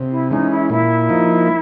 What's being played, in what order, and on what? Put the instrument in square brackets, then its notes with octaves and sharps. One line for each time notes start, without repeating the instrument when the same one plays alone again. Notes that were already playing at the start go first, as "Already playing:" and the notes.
Already playing: [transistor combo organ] C3
[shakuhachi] E4
[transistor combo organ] E3 G#3 C#4 [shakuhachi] D#4
[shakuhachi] E4
[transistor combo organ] A#2 [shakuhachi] E4
[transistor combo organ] F3 A#3 D#4